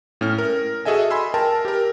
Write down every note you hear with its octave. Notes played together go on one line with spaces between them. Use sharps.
A2 C#4 F6
A#4
F#4 G#4 A4 D#5 E5 G#5
G#5 B5 C6 E6
A#4 G5 A5
G4 A#4